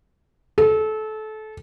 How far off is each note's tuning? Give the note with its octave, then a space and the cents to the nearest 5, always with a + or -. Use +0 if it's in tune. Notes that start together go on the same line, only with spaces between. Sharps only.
A4 -25